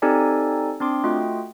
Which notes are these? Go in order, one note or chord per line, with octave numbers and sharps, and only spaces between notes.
C4 D#4 G4 A4 D5 G#5
C4 D4 C6 D6
A3 F4 F#4 D#5 G5